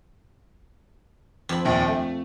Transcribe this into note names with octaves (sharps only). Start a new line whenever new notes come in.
F2 B5
A#1 D#2
A3